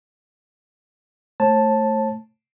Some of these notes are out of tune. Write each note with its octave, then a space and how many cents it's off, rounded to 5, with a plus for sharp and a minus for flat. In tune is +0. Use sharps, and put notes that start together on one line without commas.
A3 +0 C#5 -45 A5 +0